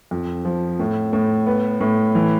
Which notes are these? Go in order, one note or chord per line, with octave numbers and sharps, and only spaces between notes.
F2
F3
A2
A2
B3
A2
E3